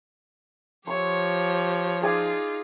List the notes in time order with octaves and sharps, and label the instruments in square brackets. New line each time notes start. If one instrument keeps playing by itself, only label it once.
[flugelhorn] F3 [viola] G4 C#5 [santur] C6 C#6 E6
[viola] D#4 F4 [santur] G#4 D5 G#5